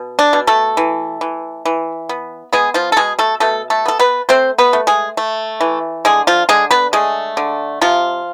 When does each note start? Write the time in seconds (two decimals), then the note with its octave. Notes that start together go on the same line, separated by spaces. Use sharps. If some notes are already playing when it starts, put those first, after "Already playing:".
Already playing: B2
0.19 D4
0.33 B2
0.47 A3 A4
0.77 E3
1.21 E3
1.65 E3
2.09 B3
2.53 G#3 B3 G#4
2.74 F3 F4
2.92 A4
2.97 B2 G#3 G#4
3.19 A3 A4
3.40 B2 A3 A4
3.70 A3 A4
3.85 B3 A4
3.99 B3 B4
4.29 A3 C4 C5
4.58 B3 B4
4.73 A3
4.87 G#3 G#4
5.17 A3
5.60 E3
6.05 D3 G#3 G#4
6.27 F3 F4
6.49 D3 G#3 G#4
6.71 B3 B4
6.93 G#3 A3 G#4
7.37 D3
7.81 C3 F3 F4